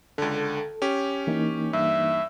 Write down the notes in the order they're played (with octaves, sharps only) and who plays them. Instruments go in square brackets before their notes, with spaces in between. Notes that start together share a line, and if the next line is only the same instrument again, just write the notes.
[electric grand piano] C#2 D3 [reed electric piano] A4
[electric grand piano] C#4 G4
[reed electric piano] E3 A#3 D#4
[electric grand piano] G2 [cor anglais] E5